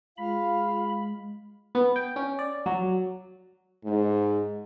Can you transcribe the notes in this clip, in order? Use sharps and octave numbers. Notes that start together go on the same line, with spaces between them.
G#3 F4 F5 B5
B3
G5
C#4
D5
F#3
G#2